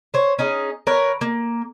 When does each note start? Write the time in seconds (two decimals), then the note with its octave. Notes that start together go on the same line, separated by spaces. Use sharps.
0.14 C5 C#5
0.39 C#4 D#4 G#4
0.87 A#4 B4 C#5
1.21 A#3